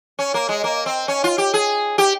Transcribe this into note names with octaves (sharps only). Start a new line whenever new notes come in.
C#4
A#3
G#3
A#3
C4
C#4
F4
G4
G#4
G4